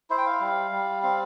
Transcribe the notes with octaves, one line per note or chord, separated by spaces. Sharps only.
E4 C5
G5
F5
G3
G3
C4 F5